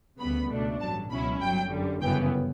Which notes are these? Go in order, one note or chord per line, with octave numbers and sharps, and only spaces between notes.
D2 C#3 G3 B3 B5
C#2 B2 A3 D4
A1 G2 F#3 A5
C#2 B2 F#3 C#4 E4 B5
G1 G2 F#3 G5
F#2 D3 G3
G1 F#2 C#3 E3 B3 G5